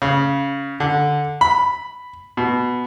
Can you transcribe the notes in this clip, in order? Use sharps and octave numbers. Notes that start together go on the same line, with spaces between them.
C#3
D3
B5
B2